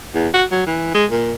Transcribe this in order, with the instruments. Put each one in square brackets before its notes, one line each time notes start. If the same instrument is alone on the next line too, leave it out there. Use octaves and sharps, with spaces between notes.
[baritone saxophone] E2
F#4
F#3
E3
G#3
A#2